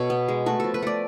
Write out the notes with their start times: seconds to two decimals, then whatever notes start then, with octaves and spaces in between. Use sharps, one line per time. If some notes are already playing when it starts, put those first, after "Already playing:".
Already playing: B2 A4 B4 C#5
0.10 B3
0.28 G#3
0.46 A3 F#4
0.60 F3 A4
0.74 B4
0.82 A3 D5